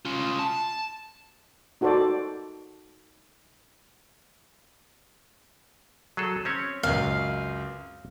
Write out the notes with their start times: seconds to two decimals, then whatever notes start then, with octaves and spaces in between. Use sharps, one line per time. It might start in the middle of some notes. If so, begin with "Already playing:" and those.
0.05 C#4 F4
0.39 A5
1.81 D#4 F#4 A4 C5 D5
6.17 F#3 G#4 A4
6.45 C4 C#4 C#5
6.83 C#2 F#2 F5